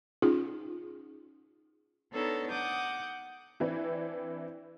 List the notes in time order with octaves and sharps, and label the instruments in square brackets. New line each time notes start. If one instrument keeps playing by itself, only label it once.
[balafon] C#4 D#4 F4 G#4
[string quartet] B3 D4 D#4 A4 A#4 C#5
F#5 D6 D#6 G6
[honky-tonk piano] E3 C4 D4 E4